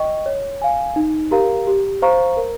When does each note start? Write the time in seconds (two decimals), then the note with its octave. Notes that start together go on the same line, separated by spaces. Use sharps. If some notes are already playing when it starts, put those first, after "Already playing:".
Already playing: D#5 G5 C#6
0.26 C#5
0.62 F5 G#5
0.96 D#4
1.31 G4 A#4 F5 A#5
1.67 G4
2.02 C5 F5 A#5 C#6
2.37 A#4